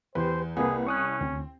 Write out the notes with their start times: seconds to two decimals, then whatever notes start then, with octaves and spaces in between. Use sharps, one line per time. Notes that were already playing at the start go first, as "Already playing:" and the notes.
0.15 E2 G4 B4 C5
0.57 C2 A#3 G#4 B4 F#5
0.87 C#4 C#6 D#6 F#6
1.21 D2 C4